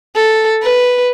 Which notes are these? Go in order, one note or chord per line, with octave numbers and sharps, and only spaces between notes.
A4
B4